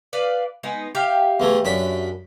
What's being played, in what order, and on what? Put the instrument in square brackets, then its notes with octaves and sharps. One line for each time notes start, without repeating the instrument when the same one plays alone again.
[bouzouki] B4 D5 F5
G#3 B3 D#4
G4 E5 F5
[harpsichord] E2 E3 A3
F#2 D4 B5